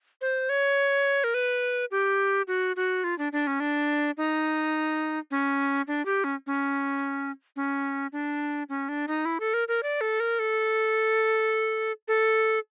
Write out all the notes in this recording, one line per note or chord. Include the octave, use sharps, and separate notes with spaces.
C5
C#5
A#4
B4
G4
F#4
F#4
F4
D4
D4
C#4
D4
D#4
C#4
D4
G4
C#4
C#4
C#4
D4
C#4
D4
D#4
E4
A4
A#4
A#4
D5
A4
A#4
A4
A4